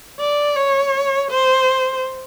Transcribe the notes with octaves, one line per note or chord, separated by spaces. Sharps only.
D5
C#5
C5